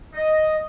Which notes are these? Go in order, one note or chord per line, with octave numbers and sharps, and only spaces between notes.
D#5